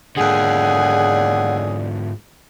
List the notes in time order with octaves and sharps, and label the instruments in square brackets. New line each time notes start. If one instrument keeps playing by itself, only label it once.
[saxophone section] D#2 G#4 [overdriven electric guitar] G#2 D3 [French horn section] A4 C#5 D5 [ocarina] F#5